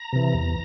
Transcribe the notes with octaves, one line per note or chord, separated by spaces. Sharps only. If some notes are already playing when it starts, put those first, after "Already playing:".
Already playing: A#5
C3 E3
E2